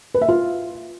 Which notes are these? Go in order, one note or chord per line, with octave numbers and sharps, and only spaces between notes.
B4
E5
F4